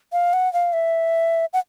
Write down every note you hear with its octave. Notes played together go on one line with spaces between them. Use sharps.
F5
F#5
F5
E5
F#5